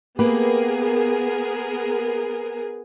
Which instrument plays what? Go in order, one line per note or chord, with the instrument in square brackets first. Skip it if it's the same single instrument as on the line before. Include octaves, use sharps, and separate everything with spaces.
[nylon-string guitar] A#3 G4 B4 [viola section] B3 G#4 A#4